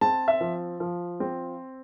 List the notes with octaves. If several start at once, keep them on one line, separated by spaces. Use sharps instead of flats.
C4 A5
E5
F3
F3
C4